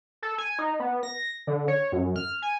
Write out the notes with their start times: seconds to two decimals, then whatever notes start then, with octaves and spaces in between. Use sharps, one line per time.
0.22 A4
0.38 G#5
0.59 D#4
0.80 B3
1.03 A#6
1.47 D3
1.68 C#5
1.92 F#2
2.16 F6
2.42 G#5